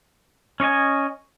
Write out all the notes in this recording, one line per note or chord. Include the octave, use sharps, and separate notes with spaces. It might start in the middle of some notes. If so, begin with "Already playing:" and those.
C#4 C#5 D#5 G#5